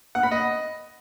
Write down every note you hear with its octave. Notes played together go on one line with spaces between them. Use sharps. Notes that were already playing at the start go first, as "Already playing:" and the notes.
F#5
B5
D#5